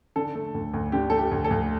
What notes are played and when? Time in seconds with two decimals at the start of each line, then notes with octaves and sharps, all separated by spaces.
0.16 D3 A4
0.35 A3
0.55 D2
0.74 D2
0.92 D3 G4
1.10 A3 A4
1.19 G4
1.31 D2
1.44 A4
1.51 D2